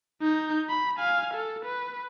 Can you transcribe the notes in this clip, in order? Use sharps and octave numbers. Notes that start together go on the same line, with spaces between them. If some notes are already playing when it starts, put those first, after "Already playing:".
D#4 G6
B5
F5 G#5
A4
B4